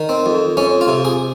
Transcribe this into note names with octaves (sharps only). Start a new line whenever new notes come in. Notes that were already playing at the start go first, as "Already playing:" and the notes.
Already playing: D#3
C4
F2
F2 C#4
F4
C3
G#4